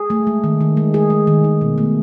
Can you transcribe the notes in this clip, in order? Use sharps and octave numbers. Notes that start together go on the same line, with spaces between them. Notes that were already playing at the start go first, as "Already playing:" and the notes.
Already playing: G#4
A3
G#3
D#3
D#3
G#3
G#3 G#4
G#3
D#3
D#3
B2
A3